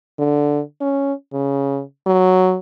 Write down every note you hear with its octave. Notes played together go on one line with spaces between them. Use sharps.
D3
C#4
C#3
F#3